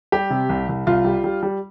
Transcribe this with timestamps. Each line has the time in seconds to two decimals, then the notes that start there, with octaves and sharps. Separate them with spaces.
0.12 G3 G4
0.30 C3
0.49 C2
0.69 C2
0.87 C2 F4
1.05 G3
1.24 G3
1.43 G3